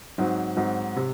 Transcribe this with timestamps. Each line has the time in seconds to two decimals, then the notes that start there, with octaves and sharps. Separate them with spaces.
0.18 G#2 F#3 C4 D#4
0.57 G#2 F#3 C4 D#4
0.96 C3